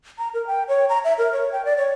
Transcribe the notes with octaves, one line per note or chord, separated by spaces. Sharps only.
A#5
A#4
G5
C#5
A#5
E5
A#4
C#5
G5
D5
C#5